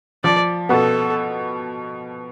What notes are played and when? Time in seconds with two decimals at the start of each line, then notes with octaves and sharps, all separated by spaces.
0.24 F3 D5
0.69 B2 B3 A4